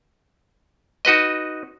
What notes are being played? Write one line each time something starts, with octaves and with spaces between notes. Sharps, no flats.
D#4 F#4 B4 D#5